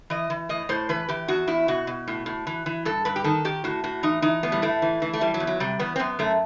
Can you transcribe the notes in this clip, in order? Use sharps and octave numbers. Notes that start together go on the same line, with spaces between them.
E3 D#5
E3
A2 D#5
A2 C5
E3 B4
E3 G4
E2 F#4
E2 E4
B2 F#4
B2
A2
A2
E3
E3
G2 A4
G2 B4
G4
D#3 A4
D#3 G4
A2 F#4
A2 F#4
E3 D#4
E3 D#4
A2 B3
G3
A2 A3
E3
E3
A3
E3 G3
F#3
E2
F#3
C3 G3
E2 B3
C4
F#2 B3
F#2 A3